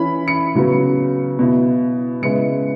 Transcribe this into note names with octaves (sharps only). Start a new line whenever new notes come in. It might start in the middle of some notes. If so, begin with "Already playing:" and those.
Already playing: E3 C#4 E4 B5
C#7
C#3 F#3 B3
B2 B3 E4
C#3 G#3 B3 E4 C#7